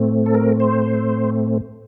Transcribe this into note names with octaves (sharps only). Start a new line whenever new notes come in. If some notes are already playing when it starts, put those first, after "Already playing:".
Already playing: A2 A3 C4
A4
A#4
C5